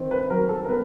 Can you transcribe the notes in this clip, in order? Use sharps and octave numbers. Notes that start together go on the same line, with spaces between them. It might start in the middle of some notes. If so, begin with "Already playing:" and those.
Already playing: D#3 C4
B4
F#3 A#4
A4
A#4
B3 B4